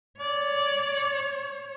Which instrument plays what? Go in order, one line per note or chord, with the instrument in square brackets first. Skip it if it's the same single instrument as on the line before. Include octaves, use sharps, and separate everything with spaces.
[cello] C#5 [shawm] D5